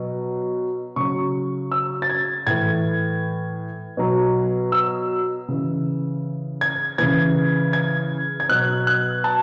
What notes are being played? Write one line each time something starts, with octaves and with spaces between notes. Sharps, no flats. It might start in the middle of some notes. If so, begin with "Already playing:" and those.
Already playing: B2 F#3
C#3 F#3 C#6
E6
A6
G#6
A2 E3 G#6
B2 F#3
E6
C#3 E3
G#6
C#3 E3 G#6
G#6
G#6
B2 F#3 F#6
F#6
A5